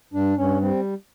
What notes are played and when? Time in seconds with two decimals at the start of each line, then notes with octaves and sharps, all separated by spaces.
0.13 G2 D4
0.37 G2 C#4
0.61 G3 C4